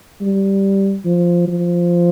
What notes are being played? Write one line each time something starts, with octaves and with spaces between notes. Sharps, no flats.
G3
F3
F3